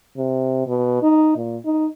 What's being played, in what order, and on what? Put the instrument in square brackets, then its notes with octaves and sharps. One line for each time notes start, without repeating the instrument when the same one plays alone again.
[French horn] C3
B2
D#4
A#2
D#4